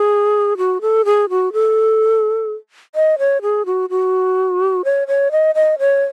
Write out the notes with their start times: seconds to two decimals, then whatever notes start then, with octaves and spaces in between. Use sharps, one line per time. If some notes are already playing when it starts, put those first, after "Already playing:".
Already playing: G#4
0.58 F#4
0.81 A4
1.05 G#4
1.30 F#4
1.53 A4
2.95 D#5
3.19 C#5
3.42 G#4
3.66 F#4
3.90 F#4
4.85 C#5
5.08 C#5
5.32 D#5
5.55 D#5
5.79 C#5